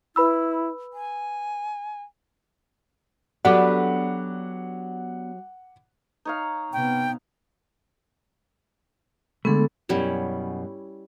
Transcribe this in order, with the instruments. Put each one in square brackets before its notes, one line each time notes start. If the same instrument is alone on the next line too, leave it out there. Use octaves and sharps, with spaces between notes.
[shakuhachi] E4 [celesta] B4 B5 E6
[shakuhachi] G#5
[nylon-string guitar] F#3 G4 A4 [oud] B3 D4 D5 [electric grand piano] F#5 D6
[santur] D#4 C#5 F5
[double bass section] C3 B3 [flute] G5
[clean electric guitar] D3 G#3 A3 [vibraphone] B3 A4
[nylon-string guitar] F#2 B2 [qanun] G3 C#4 E4